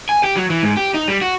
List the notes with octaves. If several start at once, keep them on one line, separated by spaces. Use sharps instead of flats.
G#5
G4
F#3
E3
G#2
G4
D#4
G3
F#4